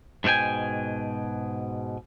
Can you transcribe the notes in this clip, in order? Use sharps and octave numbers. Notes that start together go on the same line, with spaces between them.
G#2 B2 F4 G5 G#5